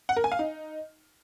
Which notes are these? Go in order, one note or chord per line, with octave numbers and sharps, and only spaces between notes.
F#5
A#4
G#5
F5
D#4